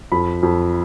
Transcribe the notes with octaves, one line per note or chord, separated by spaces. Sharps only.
F2 B5
F2